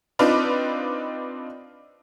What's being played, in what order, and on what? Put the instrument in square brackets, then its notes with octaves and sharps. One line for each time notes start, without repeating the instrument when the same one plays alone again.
[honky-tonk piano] C4 D4 D#4 F4 B4 D5